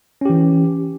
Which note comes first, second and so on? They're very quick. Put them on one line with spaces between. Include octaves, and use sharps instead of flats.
C#4 G4 E3